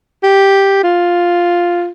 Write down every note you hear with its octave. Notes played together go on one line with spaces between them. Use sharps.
G4
F4